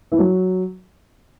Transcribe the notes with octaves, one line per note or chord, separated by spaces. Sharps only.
E3
F#3